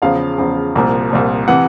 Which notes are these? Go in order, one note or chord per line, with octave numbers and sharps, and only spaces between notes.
E2 C#3 F3 F5
E2 C#3 F3
C2 A#2 F3
C2 A#2 F3
C3 E3 F#5